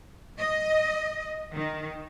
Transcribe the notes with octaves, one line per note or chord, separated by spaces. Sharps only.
D#5
D#3